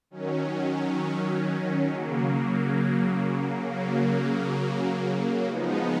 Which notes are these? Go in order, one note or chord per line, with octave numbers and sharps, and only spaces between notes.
D#3 F#3 C#4
C#3 F#3 A#3
C#3 F#3 A#3
F3 G#3 B3 D#4